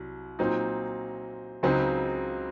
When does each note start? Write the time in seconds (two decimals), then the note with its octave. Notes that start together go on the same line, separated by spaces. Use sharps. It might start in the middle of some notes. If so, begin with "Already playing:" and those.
Already playing: C2 F#3
0.39 A#2 F#3 C4 D#4
1.63 C#2 C#3 F#3 C4 D#4